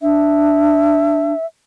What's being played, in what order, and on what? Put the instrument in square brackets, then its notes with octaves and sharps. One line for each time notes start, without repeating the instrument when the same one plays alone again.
[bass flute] D4 [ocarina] E5